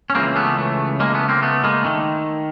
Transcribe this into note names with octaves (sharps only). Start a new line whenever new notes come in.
C#4
C#2 C#3 E3 A#3 C4
A3 B3
A3
G#3 A#3
A3 B3
A#3 C4
A3 B3
G#3 A#3
D#3 A3